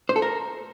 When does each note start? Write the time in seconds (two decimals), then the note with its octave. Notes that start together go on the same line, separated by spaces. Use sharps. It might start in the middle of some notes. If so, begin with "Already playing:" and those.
0.09 C5
0.16 A4
0.22 A#4